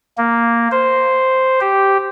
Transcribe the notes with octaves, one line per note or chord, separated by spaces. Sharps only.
A#3
C5
G4